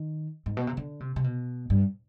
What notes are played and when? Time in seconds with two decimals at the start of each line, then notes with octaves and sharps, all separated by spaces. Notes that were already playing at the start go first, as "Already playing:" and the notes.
Already playing: D#3
0.46 G#2
0.57 B2
0.67 C3
0.77 D3
1.00 C3
1.16 C3
1.24 B2
1.70 G2